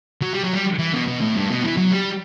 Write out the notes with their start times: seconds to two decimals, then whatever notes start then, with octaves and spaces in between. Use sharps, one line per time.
0.22 F#3
0.33 G3
0.43 F#3
0.53 G3
0.79 E3
0.93 B2
1.07 B2
1.21 A2
1.35 G2
1.50 B2
1.63 E3
1.77 F#3
1.92 G3